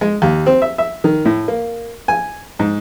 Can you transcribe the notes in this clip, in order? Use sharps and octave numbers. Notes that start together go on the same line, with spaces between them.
G#3
D#2
C4
E5
E5
D#3
A2
A#3
G#5
G#2